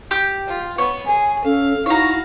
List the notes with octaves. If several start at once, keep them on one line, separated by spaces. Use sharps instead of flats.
G4
F4
B3 C#5
G#4 G#5
C#4 A4 F5
D#4 E4 F#4 C#5 F5 A#5